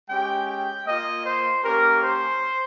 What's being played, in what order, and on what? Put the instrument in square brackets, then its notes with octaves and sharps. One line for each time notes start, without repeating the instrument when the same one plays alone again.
[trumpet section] G#3 C#4 G4 G5
G5
A#3 F4 D#5
C5
A#3 C#4 G4 A#4
C5